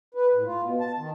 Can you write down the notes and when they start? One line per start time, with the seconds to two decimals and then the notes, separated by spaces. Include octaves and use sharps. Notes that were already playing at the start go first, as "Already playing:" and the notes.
0.14 B4
0.33 A2
0.45 F4
0.62 B2
0.80 A5
0.98 D#3